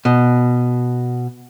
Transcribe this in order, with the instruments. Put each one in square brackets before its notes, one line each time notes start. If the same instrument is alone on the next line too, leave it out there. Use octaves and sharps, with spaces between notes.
[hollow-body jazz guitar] B2